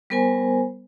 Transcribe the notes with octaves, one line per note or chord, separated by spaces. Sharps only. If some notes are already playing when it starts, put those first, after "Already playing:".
G3 B3 A#4 C5 G#5